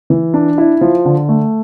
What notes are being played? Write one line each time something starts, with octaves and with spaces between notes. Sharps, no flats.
E3
D4
E4
F3
D3
A3